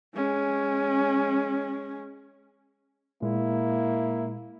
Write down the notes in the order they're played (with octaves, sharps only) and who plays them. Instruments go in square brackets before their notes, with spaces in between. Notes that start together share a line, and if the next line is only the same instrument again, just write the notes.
[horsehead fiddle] G#3 C#4
[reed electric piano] A#2 G#3 [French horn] A#3 [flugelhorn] E4